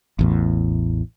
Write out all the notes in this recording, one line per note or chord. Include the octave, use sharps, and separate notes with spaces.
A1 E2 A2